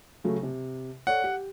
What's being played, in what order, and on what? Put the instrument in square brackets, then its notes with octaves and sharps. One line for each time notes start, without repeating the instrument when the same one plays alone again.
[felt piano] C#3 F#3 A3
C3
[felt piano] A4 C#5 D5 [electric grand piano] F#5
[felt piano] G4